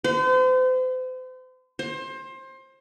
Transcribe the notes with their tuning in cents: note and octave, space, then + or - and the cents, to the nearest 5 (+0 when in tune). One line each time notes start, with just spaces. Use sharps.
C5 -40
C5 +25